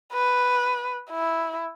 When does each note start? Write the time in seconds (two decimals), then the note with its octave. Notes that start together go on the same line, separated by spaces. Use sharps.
0.13 B4
1.11 E4